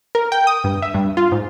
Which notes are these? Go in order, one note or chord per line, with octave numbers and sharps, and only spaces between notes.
A#4
G5
D#6
G2
E5
G2
F4
G#2